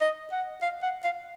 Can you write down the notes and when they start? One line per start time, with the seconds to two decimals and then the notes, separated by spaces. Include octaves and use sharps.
0.01 D#5
0.32 F#5
0.62 F5
0.82 F#5
1.04 F5